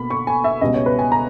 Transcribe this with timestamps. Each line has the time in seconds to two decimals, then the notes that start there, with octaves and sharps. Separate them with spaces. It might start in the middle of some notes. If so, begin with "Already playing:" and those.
Already playing: B2 A#3 B5
0.10 C#6
0.27 G#5
0.44 E5
0.61 C#2 B2 G3 D#5
0.74 C#5
0.86 B4
0.99 G#5
1.12 A#5